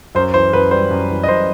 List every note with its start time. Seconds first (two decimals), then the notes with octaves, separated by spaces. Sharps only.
0.15 F#2 C5
0.34 E3 C5
0.53 F#2 B4
0.71 G3 C5
0.91 F#2
1.10 E3
1.23 D#5
1.28 F#2 C5